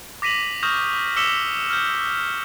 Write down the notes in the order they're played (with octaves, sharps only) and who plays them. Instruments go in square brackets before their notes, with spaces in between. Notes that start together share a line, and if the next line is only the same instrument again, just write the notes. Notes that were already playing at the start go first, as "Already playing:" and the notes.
[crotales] D6 A#6 B6 D#7 F7 F#7
C#6 D#6 F6 G6 A#6 F7
D6 E6 B6 C#7 E7 G7
F6 G6